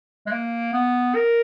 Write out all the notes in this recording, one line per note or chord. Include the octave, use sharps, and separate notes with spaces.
G#3
A#3
B3
A#4